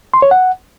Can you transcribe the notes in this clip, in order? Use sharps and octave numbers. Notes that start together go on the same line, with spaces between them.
C6
C#5
F#5